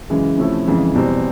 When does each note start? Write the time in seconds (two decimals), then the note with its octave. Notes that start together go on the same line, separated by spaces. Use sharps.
0.10 F#2 C#3 E3 G#3
0.38 C3 F3 A3 C#4 E4
0.67 F2 C#3 E3 G#3
0.94 E2 B2 G3 C4